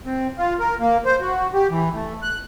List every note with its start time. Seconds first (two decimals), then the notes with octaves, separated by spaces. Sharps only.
0.06 C4
0.38 F4
0.59 A#4
0.80 A#3
1.05 C5
1.21 F#4
1.54 G4
1.70 E3
1.95 A3
2.22 F#6